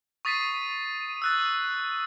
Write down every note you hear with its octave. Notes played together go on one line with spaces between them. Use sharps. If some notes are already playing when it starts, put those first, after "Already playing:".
C#6 D#6 A6 B6 C7 D#7
E6 F#6 A6